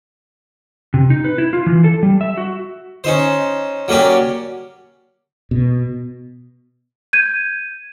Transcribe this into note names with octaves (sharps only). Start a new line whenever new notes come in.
C3
D#4
B4
E4
F4
E3
A4
G3
E5
F#4
C#4 D#4 C5
F#3 A#3 C#4 G4 D5
B2
G6 G#6 D#7